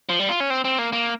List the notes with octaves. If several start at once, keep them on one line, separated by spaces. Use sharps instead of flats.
F3
G3
F4
C#4
C4
C4
A#3
A#3